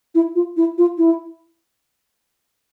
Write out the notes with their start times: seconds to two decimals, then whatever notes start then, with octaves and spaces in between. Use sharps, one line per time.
0.15 E4
0.35 F4
0.57 E4
0.78 F4
0.98 E4